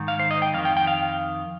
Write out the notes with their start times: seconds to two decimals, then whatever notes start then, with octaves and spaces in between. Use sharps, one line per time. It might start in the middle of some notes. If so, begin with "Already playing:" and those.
Already playing: G#2 D#3
0.08 F5
0.19 C5
0.31 D#5
0.42 G5
0.54 F2 F5
0.58 D#3
0.65 G5
0.77 G5
0.87 F5